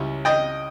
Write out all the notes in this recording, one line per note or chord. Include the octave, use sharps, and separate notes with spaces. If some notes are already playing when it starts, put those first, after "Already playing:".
Already playing: C#2 G3 C#4 E4
D#5 G5